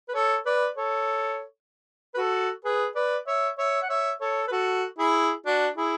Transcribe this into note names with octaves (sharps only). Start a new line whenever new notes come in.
B4
A4 C#5
B4 D5
A4 C#5
B4
F#4 A4
G#4 B4
B4 D5
C#5 E5
C#5 E5
F#5
C#5 E5
A4 C#5
B4
F#4 A4
E4 G#4
D4 F#4
E4 G#4